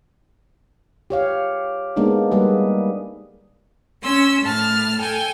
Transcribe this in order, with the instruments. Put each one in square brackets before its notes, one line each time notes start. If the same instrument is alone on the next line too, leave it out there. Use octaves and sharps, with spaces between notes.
[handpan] G4 C#5 F5
G#3 A#3 B3 D4 D#4
G3 A#3 G#4 B4
[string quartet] C#4 C6 E6
A2 A5 F6
A4 G5 G#5